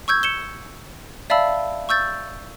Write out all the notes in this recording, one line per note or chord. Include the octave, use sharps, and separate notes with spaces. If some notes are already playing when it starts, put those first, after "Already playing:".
C#6 E6 G6 G#6
C#7 E7 G7
D5 E5 F5 A5 B5 E6
C#6 E6 G6 A6